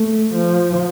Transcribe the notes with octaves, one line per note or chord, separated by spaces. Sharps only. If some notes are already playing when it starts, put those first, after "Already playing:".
Already playing: A3
F3